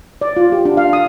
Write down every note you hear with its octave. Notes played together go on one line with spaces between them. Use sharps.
D5
F4
G4
D4
F5
D#6